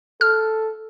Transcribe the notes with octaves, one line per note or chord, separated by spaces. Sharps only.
A4 F6